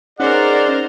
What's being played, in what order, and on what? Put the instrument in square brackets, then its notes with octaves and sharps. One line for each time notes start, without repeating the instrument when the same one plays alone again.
[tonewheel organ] C#4 D#4 [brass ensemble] G#4 D5 [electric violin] A#4 C5 [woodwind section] F#5